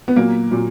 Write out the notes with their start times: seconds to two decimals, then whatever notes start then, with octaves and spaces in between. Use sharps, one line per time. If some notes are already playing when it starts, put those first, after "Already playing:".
0.08 B3
0.16 A#2 F#3 A#3
0.51 A#2 F#3